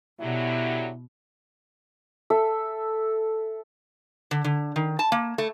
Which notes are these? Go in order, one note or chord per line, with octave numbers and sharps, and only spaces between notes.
B2 D3 F#3 E4 G4
A4 E5
D3
D3
D#3
A5
A#3
A3